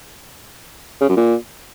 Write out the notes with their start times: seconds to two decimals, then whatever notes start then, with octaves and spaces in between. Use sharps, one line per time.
1.01 C#3
1.09 F#2
1.17 A#2